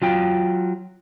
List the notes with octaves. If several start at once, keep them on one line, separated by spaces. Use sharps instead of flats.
F#3 F4 G5